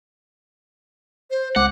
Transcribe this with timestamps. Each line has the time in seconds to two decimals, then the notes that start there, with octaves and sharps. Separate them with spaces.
1.31 C5
1.56 C#2 F#5 D6